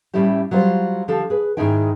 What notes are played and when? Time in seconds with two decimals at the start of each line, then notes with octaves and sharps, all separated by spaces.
0.14 A2 G3 C#4 E4 G4
0.51 F#3 G3 F4 C5
1.08 D3 F3 G4 A4
1.30 G#4 B4
1.57 G#2 D#3 G#3 D#4 E4 G5